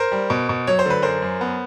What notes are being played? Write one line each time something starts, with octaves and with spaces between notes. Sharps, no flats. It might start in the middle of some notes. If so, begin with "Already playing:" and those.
Already playing: A#4 C5
G3
B2
B2
F#3 C#5
C5
D3 B4
F#2 A#4 C5
F#2
B3